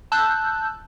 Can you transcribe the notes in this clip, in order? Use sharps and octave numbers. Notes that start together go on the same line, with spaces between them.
A5 E6 F#6 G6